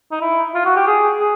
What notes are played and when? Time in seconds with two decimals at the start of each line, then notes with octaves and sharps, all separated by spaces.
0.11 D#4
0.21 E4
0.55 F4
0.65 F#4
0.76 G4
0.87 G#4
1.20 G#4